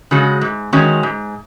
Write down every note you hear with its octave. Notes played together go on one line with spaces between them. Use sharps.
C#3 G#3 F#4
G#2
D#3 G#3 C#4 F#4
G#2